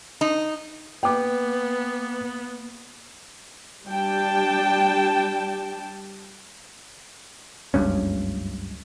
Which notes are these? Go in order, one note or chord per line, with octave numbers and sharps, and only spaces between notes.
D#4
A#3 B3 B4 G5 D6
G3 D4 G5 A5
F#1 C#2 G2 C#4